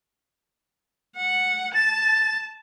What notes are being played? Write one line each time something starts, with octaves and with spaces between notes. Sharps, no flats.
F#5
A5 A6